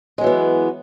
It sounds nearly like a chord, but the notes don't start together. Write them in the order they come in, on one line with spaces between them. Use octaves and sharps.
G#3 F#3 E3 B3